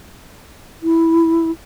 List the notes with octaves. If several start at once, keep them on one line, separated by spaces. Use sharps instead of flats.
E4